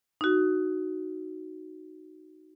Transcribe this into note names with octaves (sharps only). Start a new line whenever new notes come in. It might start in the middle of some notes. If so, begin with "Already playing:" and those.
D#4 F#4